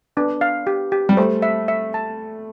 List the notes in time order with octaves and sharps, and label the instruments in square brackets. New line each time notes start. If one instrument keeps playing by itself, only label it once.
[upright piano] B3 [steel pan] D4
[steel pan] F5
G4
G4
[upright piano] G3
[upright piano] A3 [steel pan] C5
[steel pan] E5
E5
A5